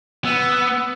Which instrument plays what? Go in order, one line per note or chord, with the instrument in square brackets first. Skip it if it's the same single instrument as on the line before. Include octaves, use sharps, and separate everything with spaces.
[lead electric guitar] B3 [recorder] E6